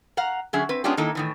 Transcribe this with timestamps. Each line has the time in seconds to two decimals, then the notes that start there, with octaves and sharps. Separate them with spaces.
0.17 F5 F#5 A#5
0.53 D3 F#3 C#4 G#4 E5
0.69 C4 B4
0.84 G#3 B3 C#4 D4 F4 G4
0.97 D#3 A#3 D#4 E4 A4
1.15 A2 D#3 E3